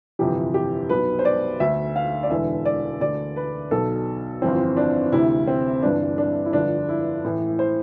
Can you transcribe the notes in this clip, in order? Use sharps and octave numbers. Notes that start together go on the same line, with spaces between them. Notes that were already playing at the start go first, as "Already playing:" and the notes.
G1 F2 C3 E3 G4
G4
B1 B2 B4
C5
D5
D2 D3 E5
F5
D5
E1 E2 D3 E5
D5
D2 D3 D5
B4
B1 B2 A4
G1 F2 E3 C4
D4
D2 C3 E3 E4
C4
G1 G2 E3 D4
D4
E4
G1 F2 D3 D4
E4
A1 A2 E3
C5